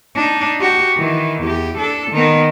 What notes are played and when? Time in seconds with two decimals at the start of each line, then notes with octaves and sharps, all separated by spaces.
0.16 D4 D#4
0.60 F#4 G4
0.97 D#3 E3
1.42 E2 G4
1.78 D4 A4
2.11 D#3 B3